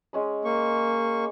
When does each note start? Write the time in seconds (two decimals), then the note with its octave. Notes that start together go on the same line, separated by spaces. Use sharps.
0.13 G#3 C#4 D#6
0.45 A#3 C#6